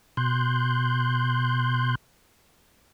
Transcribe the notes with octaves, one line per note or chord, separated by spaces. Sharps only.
B2 C6 F#6 G6